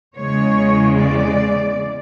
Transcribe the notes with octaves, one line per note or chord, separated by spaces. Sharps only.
E2 C#3 G#3 C#5
D5